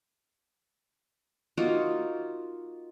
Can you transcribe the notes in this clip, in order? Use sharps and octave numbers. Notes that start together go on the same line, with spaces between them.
A#3 D#4 F4 F#4